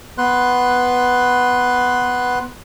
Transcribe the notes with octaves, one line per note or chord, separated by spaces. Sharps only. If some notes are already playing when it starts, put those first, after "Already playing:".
B3 B4 C6 F#6